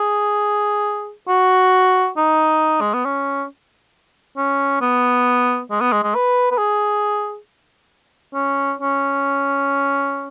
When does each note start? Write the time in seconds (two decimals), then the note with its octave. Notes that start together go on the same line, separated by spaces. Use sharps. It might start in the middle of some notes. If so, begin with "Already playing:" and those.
Already playing: G#4
1.28 F#4
2.17 D#4
2.81 G#3
2.94 B3
3.05 C#4
4.37 C#4
4.81 B3
5.71 G#3
5.81 B3
5.92 G#3
6.03 G#3
6.15 B4
6.51 B4
6.58 G#4
8.34 C#4
8.79 C#4